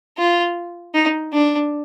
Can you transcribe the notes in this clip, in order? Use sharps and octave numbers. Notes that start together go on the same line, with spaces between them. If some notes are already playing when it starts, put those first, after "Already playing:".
F4
D#4
D4